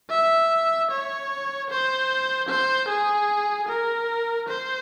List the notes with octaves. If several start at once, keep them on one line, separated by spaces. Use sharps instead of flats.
E5
C#5
C5
C5
G#4
A#4
C5